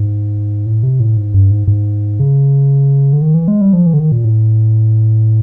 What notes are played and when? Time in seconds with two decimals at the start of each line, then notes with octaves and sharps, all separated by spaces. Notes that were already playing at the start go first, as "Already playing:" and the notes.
Already playing: G#2
0.66 A2
0.83 C3
1.00 A2
1.17 G#2
1.34 G2
1.51 G#2
1.68 G#2
2.20 C#3
3.13 D3
3.22 D#3
3.34 E3
3.48 G#3
3.61 G3
3.73 F3
3.86 E3
3.94 D3
3.99 D#3
4.12 A#2
4.24 A2